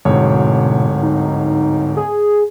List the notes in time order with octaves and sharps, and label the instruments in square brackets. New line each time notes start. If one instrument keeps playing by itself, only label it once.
[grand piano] D1 G#2 C#5 [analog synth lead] B2
[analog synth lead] D#4
G#4